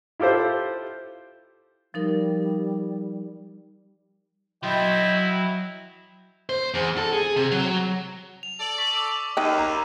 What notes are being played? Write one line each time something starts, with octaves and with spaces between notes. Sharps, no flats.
E4 F4 G4 A4 C5
F3 G3 D#4 A#4
F#3 E4 D#5 G5 C6
C5
E2
A4
G#4
C3
F#3
F7
A4 D5
C#6 B6
C#6 D6 E6
D#2 D#4 G5 F#6 D#7
A#5